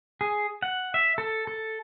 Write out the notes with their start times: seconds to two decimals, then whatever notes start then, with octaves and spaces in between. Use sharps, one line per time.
0.21 G#4
0.62 F#5
0.94 E5
1.18 A4
1.47 A4